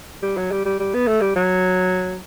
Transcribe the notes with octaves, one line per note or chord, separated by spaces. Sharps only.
G3
F#3
G3
G3
G3
B3
A3
G3
F#3